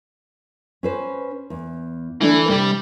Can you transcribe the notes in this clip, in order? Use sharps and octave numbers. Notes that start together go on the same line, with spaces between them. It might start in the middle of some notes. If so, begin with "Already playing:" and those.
C#4 B4 C5
E2
D3 E3 A3 D4
C3 G3